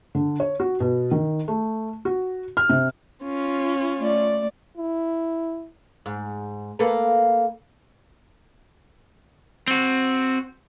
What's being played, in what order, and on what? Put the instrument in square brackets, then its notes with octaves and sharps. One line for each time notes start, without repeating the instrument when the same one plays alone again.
[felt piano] D3
C#5
F#4
B2
D#3
A3
F#4
F6
C3
[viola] C#4 F4
[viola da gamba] A3 D5
[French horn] E4
[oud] G#2
A#3 A4 B4
[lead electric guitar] C4 F#4